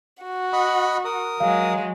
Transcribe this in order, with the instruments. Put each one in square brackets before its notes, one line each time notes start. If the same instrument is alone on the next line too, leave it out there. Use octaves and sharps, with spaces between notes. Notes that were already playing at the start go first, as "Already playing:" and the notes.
[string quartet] F#4
[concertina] D#5 F#5 B5
A#4 D#6
[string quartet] F#3 G#3 [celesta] F5